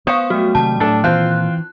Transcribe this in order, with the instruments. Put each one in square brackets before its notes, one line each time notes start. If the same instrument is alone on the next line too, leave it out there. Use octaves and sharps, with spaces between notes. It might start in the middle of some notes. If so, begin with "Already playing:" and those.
[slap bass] B3 [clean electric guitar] C5 F#5 [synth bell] F5 C#6 D#6
[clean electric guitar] F#3 G3 A3 [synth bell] F#4
[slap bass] C3 D#3 G#3 [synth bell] A5
[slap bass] A2 [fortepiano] D4 A4
[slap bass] A#2 D#3 [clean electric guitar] E3 [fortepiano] C4 F4 [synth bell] F#6